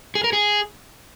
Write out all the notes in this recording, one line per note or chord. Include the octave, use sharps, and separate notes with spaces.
G#4
A#4
G#4